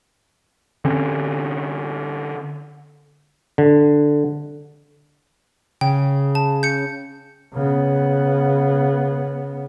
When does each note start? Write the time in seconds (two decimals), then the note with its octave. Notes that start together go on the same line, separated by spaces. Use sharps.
0.85 D3 C4 C#4
3.58 D3
5.81 C#3 G5
6.35 A5
6.63 G6 C#7
7.54 C#3 B3